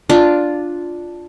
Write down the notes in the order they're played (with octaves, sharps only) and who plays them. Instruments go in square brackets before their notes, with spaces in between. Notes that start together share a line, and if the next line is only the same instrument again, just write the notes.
[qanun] D4 F4